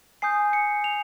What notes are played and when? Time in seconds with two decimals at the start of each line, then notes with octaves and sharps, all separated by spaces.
0.22 G#5 D#6 G6 C7
0.53 C#7
0.84 F7